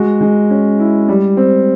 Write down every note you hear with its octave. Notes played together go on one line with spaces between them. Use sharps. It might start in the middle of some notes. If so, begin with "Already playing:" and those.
Already playing: G#3 F#4
G#3
C#4
E4
G3
C4